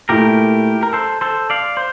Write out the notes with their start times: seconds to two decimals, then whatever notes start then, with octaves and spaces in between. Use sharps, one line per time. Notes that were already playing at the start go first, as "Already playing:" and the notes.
0.09 A#2 A3 E4 G4 A#4
0.83 A#4
0.93 A4 C5
1.21 A4 C5
1.50 D5 F5
1.77 C5